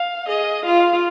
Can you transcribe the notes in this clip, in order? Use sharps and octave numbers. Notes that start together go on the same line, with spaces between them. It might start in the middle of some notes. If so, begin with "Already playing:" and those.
Already playing: F5
G#4 D#5
F4 F5